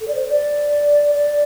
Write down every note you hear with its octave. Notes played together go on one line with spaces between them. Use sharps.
A4
D5
C5
D5
D5